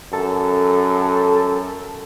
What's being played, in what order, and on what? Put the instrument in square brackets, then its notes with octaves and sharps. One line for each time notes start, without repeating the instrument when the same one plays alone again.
[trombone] F#2 [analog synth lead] A4